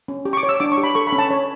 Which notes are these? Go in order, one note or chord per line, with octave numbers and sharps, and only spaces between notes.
C#4
G4
C#6
D6
C#5
E6
D4 D6
C#6
G4
B5
A4 C#6
B5
C#4
A5
C#5